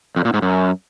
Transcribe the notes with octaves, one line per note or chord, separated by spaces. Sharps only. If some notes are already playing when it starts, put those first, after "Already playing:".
F2
A#2
G#2
F#2